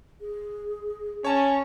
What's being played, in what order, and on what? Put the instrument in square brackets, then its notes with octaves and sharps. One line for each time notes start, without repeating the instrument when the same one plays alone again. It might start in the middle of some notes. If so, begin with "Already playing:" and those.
[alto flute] G#4
[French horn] C#4 [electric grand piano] C#5 A5